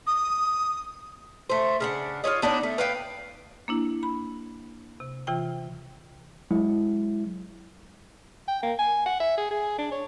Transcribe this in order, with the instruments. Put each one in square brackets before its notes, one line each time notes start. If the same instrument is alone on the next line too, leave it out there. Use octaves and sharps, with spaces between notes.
[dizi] D#6
[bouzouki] A3 C5
C#3 D4 F#5
F4 F#4 C#5 D#5
B3 D4 D#4 C#5
A3
B4 F5 G5
[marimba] A#3 D4 E4
B5
C3
C3 E3 F4 G5
[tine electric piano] F#3 G#3 E4
[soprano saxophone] G5
A#3
G#5
F#5
E5
G#4
G#4
D4
C#5